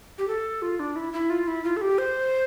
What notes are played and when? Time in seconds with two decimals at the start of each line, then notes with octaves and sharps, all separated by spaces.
0.18 G4
0.28 A4
0.62 F4
0.80 D4
0.96 E4
1.13 E4
1.30 F4
1.47 E4
1.64 F4
1.77 A4
1.81 G4
1.98 C5